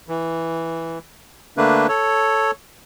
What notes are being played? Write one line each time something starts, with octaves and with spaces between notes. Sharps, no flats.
E3
D3 A3 A#3 D4 B4
A4 C#5